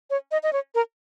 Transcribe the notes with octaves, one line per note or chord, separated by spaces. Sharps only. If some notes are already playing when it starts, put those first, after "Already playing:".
C#5
D#5
D#5
C#5
A#4